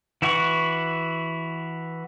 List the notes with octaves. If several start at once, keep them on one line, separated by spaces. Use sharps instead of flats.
E3 E4 F#4 F#5 C#6